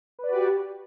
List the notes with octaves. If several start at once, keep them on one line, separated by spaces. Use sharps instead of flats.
F#4 G4 B4 D5